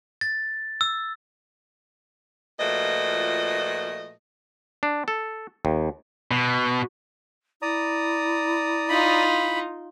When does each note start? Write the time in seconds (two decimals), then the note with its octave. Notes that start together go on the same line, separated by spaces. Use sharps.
0.21 A6
0.81 E6
2.60 A#2 F3 A3 F#4 B4 D#5
4.83 D4
5.08 A4
5.65 D#2
6.31 B2
7.62 E4 D5 A#5 D#6
8.89 D#4 F4 B5